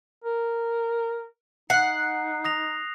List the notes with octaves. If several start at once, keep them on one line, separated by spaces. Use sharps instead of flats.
A#4
D#4 F#5 F#6 C7
D#6 A#6 F7